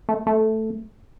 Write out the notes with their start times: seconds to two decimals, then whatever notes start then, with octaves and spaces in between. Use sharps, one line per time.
0.09 A3
0.27 A3